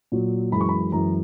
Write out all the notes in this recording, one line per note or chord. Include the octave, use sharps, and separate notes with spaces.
A#2 F#3
F#2 E3 G#3 B5
C#6
B5
F#2 E3 G#3 A#5